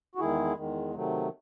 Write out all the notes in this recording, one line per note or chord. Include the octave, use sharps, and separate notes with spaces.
F#4
E2 D#3 G#3 E4 G#4
E2 D#3 G#3
C3 D#3 F#3 A3